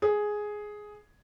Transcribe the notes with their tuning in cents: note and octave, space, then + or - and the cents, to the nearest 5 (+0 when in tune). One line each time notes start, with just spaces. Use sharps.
G#4 +5